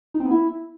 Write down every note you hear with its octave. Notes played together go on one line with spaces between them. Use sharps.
D#4
C4
B3
E4